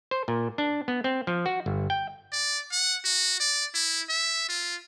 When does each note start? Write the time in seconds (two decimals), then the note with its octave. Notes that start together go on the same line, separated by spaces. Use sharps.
0.11 C5
0.28 A#2
0.58 D4
0.88 B3
1.04 C4
1.27 F3
1.46 F#4
1.66 G1
1.90 G5
2.33 D5
2.72 F#5
3.05 F#4
3.40 D5
3.74 E4
4.09 E5
4.49 F4